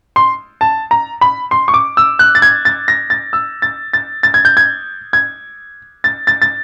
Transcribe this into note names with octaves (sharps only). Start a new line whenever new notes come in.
C6
A5
A#5
B5
C6
C#6
D6
E6
F#6
A6
G#6
A6
A#6
A6
E6
A6
A6
A6
G#6
G6
G#6
G#6
A6
A6
A6